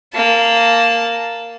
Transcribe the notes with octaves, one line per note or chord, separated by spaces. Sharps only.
A#3 A5